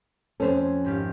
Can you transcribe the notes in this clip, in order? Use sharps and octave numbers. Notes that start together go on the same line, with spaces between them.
F2 C#4 A4 C5
G#1 G4 F5